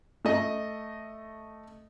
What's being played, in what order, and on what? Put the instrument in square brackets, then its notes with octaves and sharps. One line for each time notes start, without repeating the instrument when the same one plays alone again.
[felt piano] A3 D#5